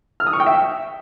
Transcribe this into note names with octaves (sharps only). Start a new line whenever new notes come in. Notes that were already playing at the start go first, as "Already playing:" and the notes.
F6
D#6
C#6
G5
E5